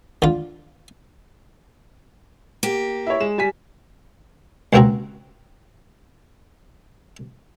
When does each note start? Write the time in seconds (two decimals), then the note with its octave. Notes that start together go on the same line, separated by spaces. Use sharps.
0.22 D3 F4
2.63 A#3 G4
3.06 E4 C#5
3.20 G#3 E7
3.38 G3 G#5 B6
4.73 C#2 C3 A#3 C4 F#4 A#5